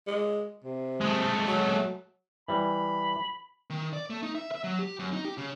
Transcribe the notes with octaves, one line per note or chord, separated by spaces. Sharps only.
G#3
C3
G#3 A3
F#3
E3 G3 B5
D#3
D5
A3
D#4
E5
E5
F#3
G4
F#2
D#4
G4
C#3